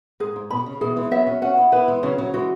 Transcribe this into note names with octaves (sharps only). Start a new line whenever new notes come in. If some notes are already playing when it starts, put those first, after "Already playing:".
G#2 G#4
G#2
B2 B5
C#3
B2 E3 G#4
E3 G#3
F#3 B3 E5
C#4 F#4
C#4 F#4 F#5
B3 E4
B3 E4 B4
E3 G#3
C#3 F#3 C#4
C#3 F#3
E3 G#3 F#4